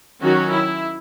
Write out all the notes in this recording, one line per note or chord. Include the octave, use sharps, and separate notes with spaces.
D#3 F#3 C#4 F#4
E4